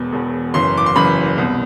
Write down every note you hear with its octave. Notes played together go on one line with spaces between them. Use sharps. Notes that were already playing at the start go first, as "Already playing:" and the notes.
Already playing: E1 E2 B2
E1 E2 B2
F#1 F#2 E3 C6
D6
C6
F#1 F#2 E3 B5
C2 B2